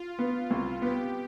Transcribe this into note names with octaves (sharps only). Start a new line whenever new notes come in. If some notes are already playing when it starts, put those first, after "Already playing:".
Already playing: F4
B3
C2
B3 G4